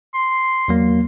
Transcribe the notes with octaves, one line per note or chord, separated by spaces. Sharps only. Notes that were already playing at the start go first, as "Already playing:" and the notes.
C6
E2 F#3 A#3